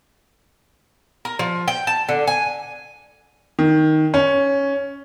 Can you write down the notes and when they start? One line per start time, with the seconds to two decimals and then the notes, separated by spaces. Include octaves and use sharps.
1.25 A#4
1.39 F3
1.68 G5
1.87 A5
2.09 D3
2.27 G#5
3.59 D#3
4.14 C#4